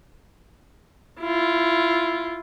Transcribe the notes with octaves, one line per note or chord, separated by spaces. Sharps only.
E4 F4